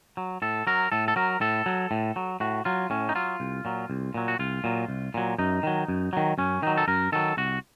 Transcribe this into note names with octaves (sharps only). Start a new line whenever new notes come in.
F#3
A2 A4
F#3 A#4
A2 A4
A4
F#3 A#4
A2 A4
F#3
A2
F#3
A2 F#4
F#3 F4
A2 C#4
D#4
F#3 F4
C2
A#2 F#3
C2
A#2 F#3
F#4
C2 F4
A#2 F#3
C2
A#2 F#3
F#2 D#4
D#3 F#3
F#2
D#3 F#3
F#2 C#4
D#3 F#3 D#4
A4
F#2 A#4
D#3 F#3 A4
C2 F#4